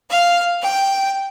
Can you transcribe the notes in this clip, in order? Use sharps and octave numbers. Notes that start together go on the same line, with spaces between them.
F5
G5